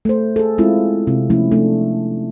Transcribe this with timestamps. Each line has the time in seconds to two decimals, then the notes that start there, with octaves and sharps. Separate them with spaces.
0.05 A3 C5
0.36 G#4 A4
0.58 G#3 B3 C4 E4 F4
1.07 C3
1.30 F3 A3 B3 C#4 E4
1.52 A3 D4